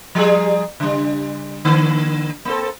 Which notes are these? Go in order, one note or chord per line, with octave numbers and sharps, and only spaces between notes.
F3 G3 G#4
C#3 G3
D3 A#3
A#3 C4 A4